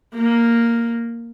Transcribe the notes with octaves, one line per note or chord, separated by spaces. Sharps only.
A#3